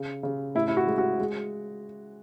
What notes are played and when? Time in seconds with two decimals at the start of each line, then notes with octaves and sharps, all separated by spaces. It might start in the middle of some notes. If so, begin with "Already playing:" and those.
Already playing: C#3
0.23 C#3
0.55 A2 E4
0.68 E4
0.77 F#4
0.87 G#3
0.98 F#4
1.19 G#3